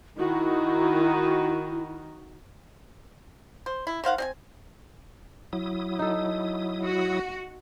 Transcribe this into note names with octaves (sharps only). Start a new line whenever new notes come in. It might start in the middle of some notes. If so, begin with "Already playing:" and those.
D#3 D#4 E4 F#4
C5
E4
D#3 C5 F5 F#5
C4 D#5 G#5
F#3 E4 D#6
D#4 A4
F#4